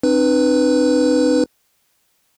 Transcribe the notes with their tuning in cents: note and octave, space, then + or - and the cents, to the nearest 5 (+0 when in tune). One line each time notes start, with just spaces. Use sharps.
C4 +15 D#4 -40 B4 +0